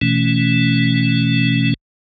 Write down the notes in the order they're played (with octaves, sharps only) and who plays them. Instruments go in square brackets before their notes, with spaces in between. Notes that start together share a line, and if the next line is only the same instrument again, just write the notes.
[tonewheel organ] B2 E3 A3 C#4